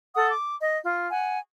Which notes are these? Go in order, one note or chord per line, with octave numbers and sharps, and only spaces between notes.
A4 F#5 D#6
D6
D#5
F4
F#5 G#5